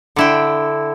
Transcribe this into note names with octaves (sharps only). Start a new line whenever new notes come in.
D3 E4 G5